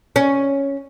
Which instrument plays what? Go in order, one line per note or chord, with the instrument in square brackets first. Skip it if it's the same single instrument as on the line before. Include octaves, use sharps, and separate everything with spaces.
[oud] C#4